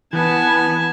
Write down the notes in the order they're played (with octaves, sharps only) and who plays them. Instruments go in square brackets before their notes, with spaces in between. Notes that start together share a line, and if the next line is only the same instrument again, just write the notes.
[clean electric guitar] E3 [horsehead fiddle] B3 B4 [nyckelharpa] G#5 A5